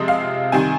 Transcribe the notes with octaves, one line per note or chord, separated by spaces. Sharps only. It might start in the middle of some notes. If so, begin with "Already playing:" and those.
Already playing: C3 F3 G#3 C4 D#5
F5
D#3 G3 C4 G#5